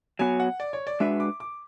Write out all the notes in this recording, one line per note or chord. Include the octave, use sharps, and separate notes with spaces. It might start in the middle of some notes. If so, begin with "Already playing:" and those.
F#3 B3 F#4 C#5 G#5
F#5
D5
C#5
D5
G#3 D4 F#4 B4 E5
D6
D6